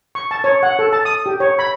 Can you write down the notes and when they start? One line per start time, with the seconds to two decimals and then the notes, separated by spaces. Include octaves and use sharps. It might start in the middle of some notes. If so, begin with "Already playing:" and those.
0.15 C#6
0.31 A5
0.44 C#5
0.63 F#5
0.79 A4
0.93 A5
1.05 D#6
1.26 G4
1.40 C#5
1.59 B5